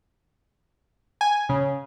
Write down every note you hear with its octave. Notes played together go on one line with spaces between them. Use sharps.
G#5
C#3